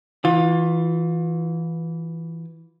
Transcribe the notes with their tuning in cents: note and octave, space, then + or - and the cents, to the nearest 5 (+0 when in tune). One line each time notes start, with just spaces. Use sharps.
E3 +0 F4 +30